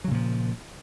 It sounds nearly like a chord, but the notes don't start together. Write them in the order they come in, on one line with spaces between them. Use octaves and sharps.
F#3 C#3 A#2 F3